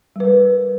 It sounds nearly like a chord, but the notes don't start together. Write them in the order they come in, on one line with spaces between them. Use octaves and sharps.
G3 B4 A#4